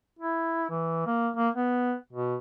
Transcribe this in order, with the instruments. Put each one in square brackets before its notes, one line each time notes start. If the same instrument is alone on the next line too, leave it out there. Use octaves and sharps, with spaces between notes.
[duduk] E4
E3
A#3
A#3
B3
B2